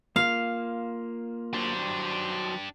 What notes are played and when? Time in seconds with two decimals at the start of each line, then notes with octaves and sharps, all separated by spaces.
0.16 A#3 F4 F5
1.54 F#3 D4 G4 C5